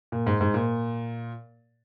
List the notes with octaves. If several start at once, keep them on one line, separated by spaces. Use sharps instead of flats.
A#2
G#2
G#2
A#2